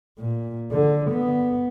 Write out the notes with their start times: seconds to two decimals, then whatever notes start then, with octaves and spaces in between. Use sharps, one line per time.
0.19 A#2
0.71 D3
1.11 B3